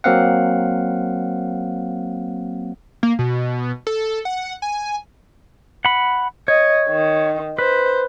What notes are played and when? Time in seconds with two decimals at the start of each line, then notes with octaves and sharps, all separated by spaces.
0.04 F#3 A#3 C4 F5 F#5
3.03 A#3
3.19 B2
3.87 A4
4.25 F#5
4.62 G#5
5.85 F#5 B5
6.48 C#5 D#5
6.89 D#3
7.59 B4 C5